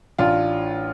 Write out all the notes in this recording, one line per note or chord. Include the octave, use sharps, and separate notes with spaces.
A1 D4 F4